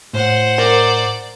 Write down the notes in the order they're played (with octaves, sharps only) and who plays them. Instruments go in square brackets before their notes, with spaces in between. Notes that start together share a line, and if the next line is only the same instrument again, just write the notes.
[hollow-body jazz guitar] A2 [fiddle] C5 F#5
[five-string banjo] A#4 [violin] D5